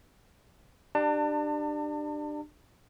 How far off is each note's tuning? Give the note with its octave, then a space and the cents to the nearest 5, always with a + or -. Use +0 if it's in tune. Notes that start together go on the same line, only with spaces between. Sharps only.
D4 +25 G4 +0 A5 +40